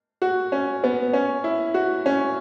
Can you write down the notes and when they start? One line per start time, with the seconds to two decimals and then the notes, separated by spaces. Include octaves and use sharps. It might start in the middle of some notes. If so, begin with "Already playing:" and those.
0.22 F#4
0.52 C#4
0.84 B3
1.13 C#4
1.44 E4
1.74 F#4
2.06 C#4